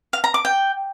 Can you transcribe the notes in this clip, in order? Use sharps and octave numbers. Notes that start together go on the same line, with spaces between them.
F5
A#5
D6
G5